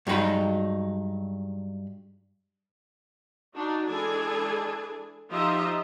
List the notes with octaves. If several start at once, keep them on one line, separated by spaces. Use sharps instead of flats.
G2 F#3 G#3 D#4 F#4 B5
D4 D#4 F#4
E3 G#3 D4 G#4 A4 G#5
F3 D#4 F4 G4 D#5 E5